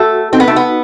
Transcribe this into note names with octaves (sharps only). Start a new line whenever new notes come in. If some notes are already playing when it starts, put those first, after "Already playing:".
Already playing: A3 F#4 A4
C4 D#4
B3
A3
B3